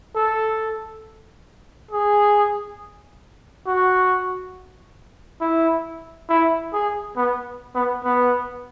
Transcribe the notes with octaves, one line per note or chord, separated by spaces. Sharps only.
A4
G#4
F#4
E4
E4
G#4
B3
B3
B3